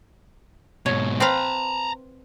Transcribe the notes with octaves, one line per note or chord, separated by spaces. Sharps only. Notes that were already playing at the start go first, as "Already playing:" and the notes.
G#2 B2 C#5
C4 B4 F5 A#5 B5